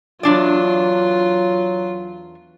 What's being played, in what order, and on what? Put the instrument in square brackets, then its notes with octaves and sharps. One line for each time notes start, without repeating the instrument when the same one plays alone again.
[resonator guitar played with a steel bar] E2 D4 D5 [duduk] F#3 [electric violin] F4